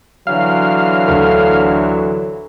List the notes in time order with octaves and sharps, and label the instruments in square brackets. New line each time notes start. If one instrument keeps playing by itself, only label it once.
[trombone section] D3 E3 F#3 [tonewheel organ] F5
[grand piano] D2